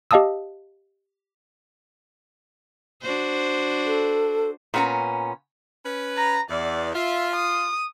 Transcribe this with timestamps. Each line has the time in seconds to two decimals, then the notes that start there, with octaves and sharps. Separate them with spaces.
0.11 G4 D#5 F5 A5 D#6 E6
3.02 D4 F#4 C5
3.86 A4
4.74 A#2 B3 C#4 F#4 A#5
5.85 C#4 B4
6.17 A#5
6.50 E2 D5
6.95 F4 E5
7.35 D#6